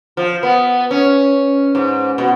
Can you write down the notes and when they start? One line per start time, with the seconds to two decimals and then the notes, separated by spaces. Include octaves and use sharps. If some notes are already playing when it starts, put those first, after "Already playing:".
0.17 F3
0.43 B3
0.91 C#4
1.75 G#2
2.18 B2